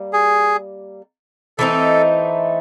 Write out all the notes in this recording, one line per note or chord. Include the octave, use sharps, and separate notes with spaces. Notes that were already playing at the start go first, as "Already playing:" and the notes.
Already playing: G3 A#3
G#4
E3 A3 C4 D#4 A4